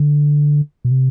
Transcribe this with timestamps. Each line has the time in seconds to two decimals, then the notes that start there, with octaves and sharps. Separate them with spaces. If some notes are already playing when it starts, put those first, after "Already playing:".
Already playing: D3
0.85 B2
0.91 C3